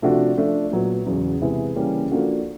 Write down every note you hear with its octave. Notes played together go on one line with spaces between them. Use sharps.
C3 F3 A3 D4 F#4
F3 A3 D4
A#2 F#3 B3
E2 C#3 F#3
C3 E3 G#3 B3 E4
C#3 E3 G3 A#3 C#4
F3 A#3 D4 F#4 A4